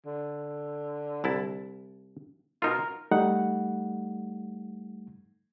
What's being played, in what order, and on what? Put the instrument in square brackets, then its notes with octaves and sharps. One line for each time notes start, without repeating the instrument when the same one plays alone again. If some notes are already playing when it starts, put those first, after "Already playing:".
[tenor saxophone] D3
[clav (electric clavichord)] C2 E4 A5
[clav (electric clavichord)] B2 D#4 F4 [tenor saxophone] A#4
[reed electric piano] G3 A3 D#4 F#5